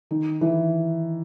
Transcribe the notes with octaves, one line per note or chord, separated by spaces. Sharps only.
D#3
E3